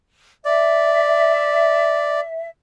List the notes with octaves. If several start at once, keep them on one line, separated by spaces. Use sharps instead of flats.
D5 E5